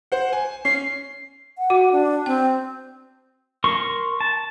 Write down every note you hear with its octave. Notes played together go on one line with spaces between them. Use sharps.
C5 F#5
G#5
C#4 C7
F#5
F#4
D4
C4 G5
A#4 C6 C#6
A5